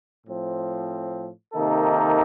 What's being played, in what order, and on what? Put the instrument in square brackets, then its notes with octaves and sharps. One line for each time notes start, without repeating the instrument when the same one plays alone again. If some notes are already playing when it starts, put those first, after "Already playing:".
[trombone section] A2 F3 C4
C3 D#3 A#3 D#4 A4